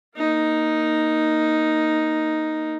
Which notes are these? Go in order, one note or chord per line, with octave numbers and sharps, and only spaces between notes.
A#3 D#4